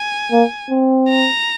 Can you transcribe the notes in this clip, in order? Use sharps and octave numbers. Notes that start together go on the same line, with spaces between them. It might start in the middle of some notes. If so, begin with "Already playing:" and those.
Already playing: G#5
A#3
C4
A#5